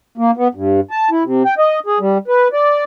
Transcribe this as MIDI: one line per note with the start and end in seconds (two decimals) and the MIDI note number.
0.18 0.31 58
0.37 0.48 59
0.55 0.80 43
0.91 1.09 81
1.11 1.23 64
1.24 1.43 48
1.45 1.54 79
1.59 1.79 75
1.86 1.99 68
2.00 2.18 55
2.28 2.48 71
2.53 2.84 74